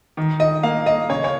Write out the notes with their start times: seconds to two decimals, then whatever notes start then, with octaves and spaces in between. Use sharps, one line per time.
0.17 D#3
0.40 D#5
0.63 A#3 F5
0.86 D#5
1.10 C#3 C#5
1.24 C#5